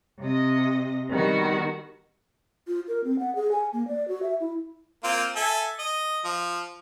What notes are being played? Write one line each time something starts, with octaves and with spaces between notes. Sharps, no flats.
C3 D#5
D#3 G3 B3 F#4
F4
A#4
C4
F#5
G#4
G#5
A#3
D5
F#4
E5
E4
A#3 C4 F4
A4 E5 G#5
D#5
F3